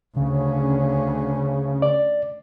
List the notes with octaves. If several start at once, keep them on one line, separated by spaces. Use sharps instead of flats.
D2 C#3 C#4
D5